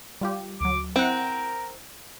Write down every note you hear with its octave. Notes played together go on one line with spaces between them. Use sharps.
G3 F4 G4
D2 F#3 D6
C4 E4 A#4 F#5